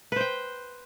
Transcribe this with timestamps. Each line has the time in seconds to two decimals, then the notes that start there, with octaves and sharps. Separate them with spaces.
0.12 B4
0.16 C5
0.21 G5